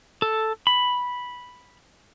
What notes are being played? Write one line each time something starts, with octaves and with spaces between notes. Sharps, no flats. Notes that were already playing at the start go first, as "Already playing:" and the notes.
A4
B5